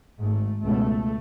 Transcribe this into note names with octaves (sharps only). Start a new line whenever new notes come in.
G#1 G#2 A3
C#2 B2 A3